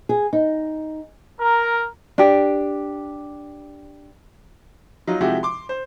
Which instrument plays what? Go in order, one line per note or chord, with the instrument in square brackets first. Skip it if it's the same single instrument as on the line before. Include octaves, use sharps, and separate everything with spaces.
[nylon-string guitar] G#4
D#4
[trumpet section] A#4
[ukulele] D4 G4
[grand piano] F#3 D#4 F4
C3 F3 G#3 E4 F#4 G4
C6 D6
C5